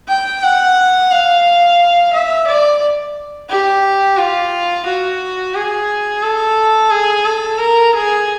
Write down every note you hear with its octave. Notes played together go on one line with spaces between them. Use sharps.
G5
F#5
F5
E5
D5
G4
F4
F#4
G#4
A4
G#4
A4
A#4
G#4